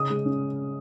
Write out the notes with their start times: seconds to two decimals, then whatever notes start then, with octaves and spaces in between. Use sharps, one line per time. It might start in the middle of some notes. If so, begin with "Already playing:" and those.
Already playing: C#3 C#4 D#6
0.10 G#3
0.25 C#4